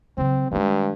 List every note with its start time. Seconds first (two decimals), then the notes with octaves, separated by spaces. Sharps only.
0.18 C#3 F#3 C4
0.51 G2 D#3 G#3